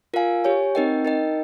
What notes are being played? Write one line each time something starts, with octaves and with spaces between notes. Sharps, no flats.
F4 A#4 F5 G#5
G4 C#5 G#5
C4 D#4 A#4 D#5 G5
D#4 A#4 D#5 G5